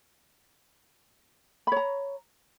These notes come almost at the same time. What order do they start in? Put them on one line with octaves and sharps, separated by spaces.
B5 C#5 A#5